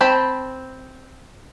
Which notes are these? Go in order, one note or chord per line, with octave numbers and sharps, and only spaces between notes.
C4 G5 A5 B5